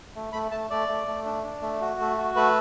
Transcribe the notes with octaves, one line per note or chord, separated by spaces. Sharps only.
A3
A3 B5
A3 A5
A3 D5
A3
A3
D4
D4
A3
F#4
A3
F#4
A3 B4